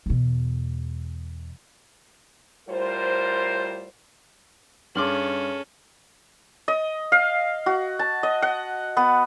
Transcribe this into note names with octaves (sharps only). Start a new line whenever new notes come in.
E2 B2
A2 G3 F4 A#4 C5
G2 C#4 G#4 A4 C6 D6 F6 F#7
D#5
F5
F#4
A5
D#5
F#5
B3